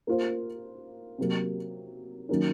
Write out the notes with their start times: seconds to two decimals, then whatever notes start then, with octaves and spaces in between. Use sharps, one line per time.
0.07 A#3 F4 C5
1.18 C3 F#3 A#3
2.29 D#3 F#3 A#3 C#4